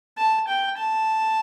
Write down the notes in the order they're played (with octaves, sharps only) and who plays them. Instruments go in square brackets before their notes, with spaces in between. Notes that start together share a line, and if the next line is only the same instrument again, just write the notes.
[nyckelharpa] A5
G5
A5